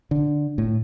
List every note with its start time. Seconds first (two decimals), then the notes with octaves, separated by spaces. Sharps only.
0.11 D3
0.58 A2